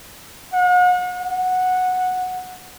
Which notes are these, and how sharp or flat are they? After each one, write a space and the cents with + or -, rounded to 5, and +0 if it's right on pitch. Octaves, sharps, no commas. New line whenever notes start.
F#5 -40
F#5 -10